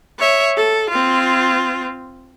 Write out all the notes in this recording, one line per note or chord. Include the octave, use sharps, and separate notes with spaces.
C#5 E5
A4
C4 F4